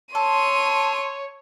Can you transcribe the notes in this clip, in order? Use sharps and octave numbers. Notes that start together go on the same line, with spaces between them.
A4 C#5 C6 D#7